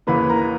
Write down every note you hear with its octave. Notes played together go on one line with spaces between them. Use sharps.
D#2 C#3 E3 A#3 B4 B5
A#4 A#5